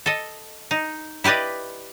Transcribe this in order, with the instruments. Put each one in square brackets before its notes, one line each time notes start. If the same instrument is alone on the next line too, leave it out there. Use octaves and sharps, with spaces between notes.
[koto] A4 D#5
D#4
E4 G4 B4 D5 D#5